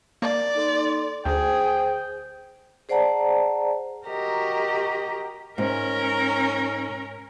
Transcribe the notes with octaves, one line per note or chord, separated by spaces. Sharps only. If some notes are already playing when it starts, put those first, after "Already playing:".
A#3 D5
D#4 A4 C6
D2 G#4 C5 G5
G#4 C5 D5 F#5 A5 A#5
F#4 G4 A#4 D#5 A#5
G#2 C#4 A#4